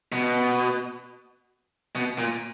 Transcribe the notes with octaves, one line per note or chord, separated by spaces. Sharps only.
B2
B2
A#2